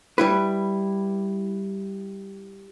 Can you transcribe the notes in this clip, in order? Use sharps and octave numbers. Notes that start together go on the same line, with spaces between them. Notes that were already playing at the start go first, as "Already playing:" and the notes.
G3 E4 B4